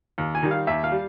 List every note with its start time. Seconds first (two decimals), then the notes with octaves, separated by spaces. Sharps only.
0.18 D#2
0.35 G#5
0.43 D#3 G3
0.51 F5
0.67 D#2 E5
0.84 F5
0.92 G3